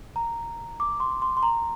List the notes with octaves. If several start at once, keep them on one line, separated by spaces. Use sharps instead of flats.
A#5
D6
C6
C6
C6
A#5